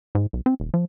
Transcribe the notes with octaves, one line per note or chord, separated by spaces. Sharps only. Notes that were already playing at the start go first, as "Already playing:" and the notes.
G#2
B1
C4
D#1
F3